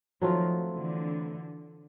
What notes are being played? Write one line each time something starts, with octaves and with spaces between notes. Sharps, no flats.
D#3 F3 F#3 A3 C4 F4
D3 E3